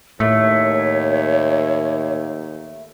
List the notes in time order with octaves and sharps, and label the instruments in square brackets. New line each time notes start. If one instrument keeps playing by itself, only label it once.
[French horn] D#2 [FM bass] A2 [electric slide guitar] A3 [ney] C#5